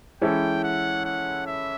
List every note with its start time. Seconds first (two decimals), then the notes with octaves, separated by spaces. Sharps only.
0.21 E3 G#3 C#4 E4 A4 G5
0.64 F#5
1.05 F#5
1.46 E5